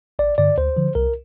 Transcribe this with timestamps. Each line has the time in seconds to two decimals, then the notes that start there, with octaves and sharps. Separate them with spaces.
0.19 A1 D5
0.38 G2 D3 D5
0.58 D2 C5
0.77 D3 F3
0.95 C2 A#4